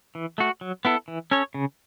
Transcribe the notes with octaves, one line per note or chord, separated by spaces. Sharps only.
E3
A3 F#4
F#3
B3 E4 A4
E3
C#4 A4 C#5
C#3